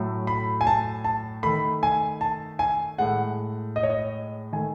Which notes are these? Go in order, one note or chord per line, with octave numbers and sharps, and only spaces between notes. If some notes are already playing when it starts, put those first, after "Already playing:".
Already playing: A2 F#3 A3
B5
G#5
A5
A5
D#3 A3 B5
G#5
A5
G#5
A2 G#3 F#5
D#5
C#5
D#5
D#3 A3 G#5